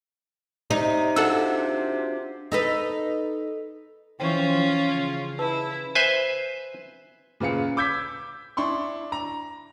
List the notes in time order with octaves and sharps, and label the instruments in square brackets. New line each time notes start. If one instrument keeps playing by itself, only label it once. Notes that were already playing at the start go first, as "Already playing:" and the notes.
[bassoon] C3 [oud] D#4
[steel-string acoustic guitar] D4 F4 F#4 [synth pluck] A4 F#5 E6
[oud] D#4 A4 B4
[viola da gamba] E3 F3 C5 [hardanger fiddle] C#4 F4 [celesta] G5 C#6
[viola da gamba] F3
C#3
[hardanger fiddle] E4 [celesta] B4 A5 E6
[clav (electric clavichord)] B4 C5 E5 G#5
[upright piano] A#2 C#3 B4 F5 C#7
D6 E6 G6 G#6 B6
D4 E4 C6 C#6
A#5